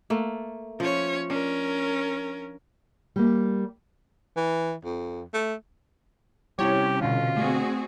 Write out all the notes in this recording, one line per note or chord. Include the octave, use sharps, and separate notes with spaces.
A3 A#3
F3 C#4 C#5
C#4 D4 A#4
G3 A#3
E3
F2
A3
C3 G3 C#4 E4 G4 C#5
B2 D3 F4
A3 C4 F#4 G#4